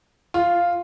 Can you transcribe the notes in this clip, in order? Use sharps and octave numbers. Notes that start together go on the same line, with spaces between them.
F4